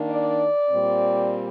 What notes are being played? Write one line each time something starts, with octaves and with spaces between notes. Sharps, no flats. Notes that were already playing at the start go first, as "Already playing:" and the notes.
Already playing: D#3 A#3 D4
D5
A#2 G3 C4